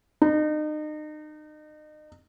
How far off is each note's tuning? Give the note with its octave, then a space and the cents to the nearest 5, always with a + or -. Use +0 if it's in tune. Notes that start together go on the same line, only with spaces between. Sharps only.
D#4 -35